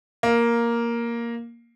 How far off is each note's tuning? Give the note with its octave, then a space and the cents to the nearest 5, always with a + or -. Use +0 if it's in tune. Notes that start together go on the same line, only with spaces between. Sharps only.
A#3 +5 F5 +0